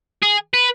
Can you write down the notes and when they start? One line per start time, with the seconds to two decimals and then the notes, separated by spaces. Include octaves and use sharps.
0.22 G#4
0.54 B4